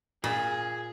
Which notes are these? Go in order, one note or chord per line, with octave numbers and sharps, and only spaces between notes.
A#2 G#4